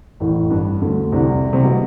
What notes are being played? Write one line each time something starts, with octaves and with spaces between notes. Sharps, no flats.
A1 A2
G2
D2 D3
C2 C3
C3
B2